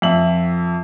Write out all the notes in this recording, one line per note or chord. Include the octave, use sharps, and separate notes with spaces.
F2 E5 F#7